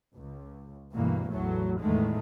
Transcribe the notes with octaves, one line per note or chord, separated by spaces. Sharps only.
C#2
D2 G2 B2 E3 A#3
A1 E2 A2 F#3 A3
E2 A2 D#3 G#3 A3